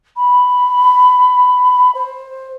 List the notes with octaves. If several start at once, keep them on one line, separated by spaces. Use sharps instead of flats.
B5
C5